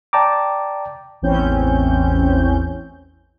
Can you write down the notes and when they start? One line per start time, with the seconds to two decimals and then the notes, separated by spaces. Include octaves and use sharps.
0.13 D5 G5 A5 A#5 D6
1.22 A1 E2 E3 C4 C#4 G6